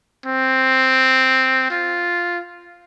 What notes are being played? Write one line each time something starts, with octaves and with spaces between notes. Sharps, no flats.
C4
F4